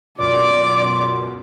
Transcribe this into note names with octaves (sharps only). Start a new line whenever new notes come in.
C#2 F#2 B2 F4 D5 D6